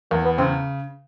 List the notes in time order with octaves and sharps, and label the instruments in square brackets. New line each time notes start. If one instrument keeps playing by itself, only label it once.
[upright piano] E2 [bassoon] A#3
[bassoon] B3
[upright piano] C#3 [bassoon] C4